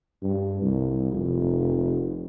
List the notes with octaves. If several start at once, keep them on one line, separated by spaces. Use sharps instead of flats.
G2
C2
F1